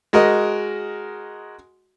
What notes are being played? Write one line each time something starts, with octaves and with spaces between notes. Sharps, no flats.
G#3 F#4 A#4 D#5